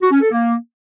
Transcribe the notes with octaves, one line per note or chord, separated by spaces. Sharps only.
F#4
C#4
A4
A#3